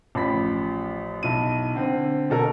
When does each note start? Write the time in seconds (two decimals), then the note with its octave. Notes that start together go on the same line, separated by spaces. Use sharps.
0.15 A1 F3 B5 B6
1.23 B1 E4 D#7
1.75 D3 C4
2.30 B2 A4 A#4